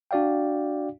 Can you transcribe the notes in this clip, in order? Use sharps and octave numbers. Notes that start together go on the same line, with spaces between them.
D4 F#4 D5 F5 G5